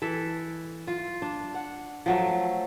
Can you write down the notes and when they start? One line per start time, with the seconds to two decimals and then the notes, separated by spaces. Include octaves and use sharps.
0.02 E3 A4 E5
0.87 F4
1.22 D4
1.54 F#5
2.06 F3 F#3 A3